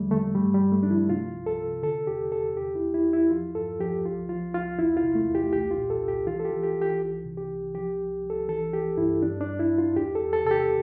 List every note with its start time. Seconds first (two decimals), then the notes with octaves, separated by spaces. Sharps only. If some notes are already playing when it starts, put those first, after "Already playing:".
Already playing: E2 D3 F3 G3 A3
0.11 D3 A3
0.35 G2 G3
0.54 G3
0.60 G2
0.72 A3
0.83 F3 D4
0.90 E4
1.09 C3 F4
1.34 C2
1.46 A4
1.58 C3
1.83 D3 A4
2.07 E2 G4
2.32 E2 A4
2.57 E2 G4
2.75 E4
2.81 E2
2.94 E4
3.06 E2
3.13 E4
3.31 F3 F4
3.55 G2 A4
3.80 F3 G4
4.05 C2 F4
4.29 F3 F4
4.54 C2 F4
4.78 E2 E4
4.97 F4
5.03 C3
5.15 A3
5.27 E2
5.35 G4
5.53 C2 G4
5.71 F4
5.77 A#2
5.90 A4
6.03 C2
6.08 G4
6.27 E3 F4
6.39 A4
6.45 G4
6.51 E3
6.63 G4
6.75 E3
6.81 G4
7.01 C2
7.25 C3
7.37 G4
7.50 C2
7.74 F3 G4
8.00 C2
8.24 C2
8.30 A4
8.49 E3 A4
8.73 E3 G4
8.97 G2 E4
9.22 G2 D4
9.41 D4
9.46 G2
9.59 E4
9.72 G2
9.78 F4
9.96 E2 G4
10.15 A4
10.21 E2
10.33 A4
10.45 C3 A4
10.51 G4